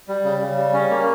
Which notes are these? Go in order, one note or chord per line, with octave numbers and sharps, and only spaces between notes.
G3
C#3
C#3
G3
C#4
A#3